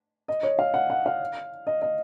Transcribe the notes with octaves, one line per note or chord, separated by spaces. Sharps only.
D#5
C#5
F5
F#5
F#5
F5
D#5
D#5